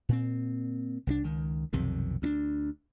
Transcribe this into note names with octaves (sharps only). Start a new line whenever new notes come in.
A#2 C4
C2 E3 D4
C#2 D#3
B1 F2 C3 D#3
D2 C4 D4